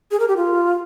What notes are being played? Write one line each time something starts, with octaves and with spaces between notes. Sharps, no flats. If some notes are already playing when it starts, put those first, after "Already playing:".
G#4
A#4
G4
F4